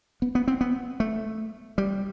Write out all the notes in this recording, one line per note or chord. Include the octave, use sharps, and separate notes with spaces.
B3
B3
C4
B3
A3
G3